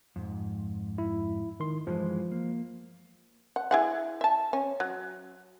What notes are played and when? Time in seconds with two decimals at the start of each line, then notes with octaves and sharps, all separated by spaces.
0.16 F2 G#2
0.98 E4
1.60 D#3 C6
1.87 G2 E3 F3 G#3
2.32 A#3
3.56 F#5
3.71 E4 G#4 F#5
4.21 E5 A5
4.53 C#4
4.80 F#3